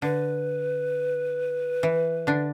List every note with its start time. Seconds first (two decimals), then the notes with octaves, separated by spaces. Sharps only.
0.02 D3 B4
1.83 E3
2.27 D3 D4